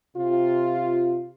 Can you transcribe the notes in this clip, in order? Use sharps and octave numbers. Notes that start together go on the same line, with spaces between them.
C3 F4